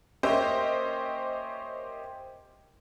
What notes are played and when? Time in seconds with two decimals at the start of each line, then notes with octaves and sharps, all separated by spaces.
0.23 A#3 C#4 G4 C5 D#5 E5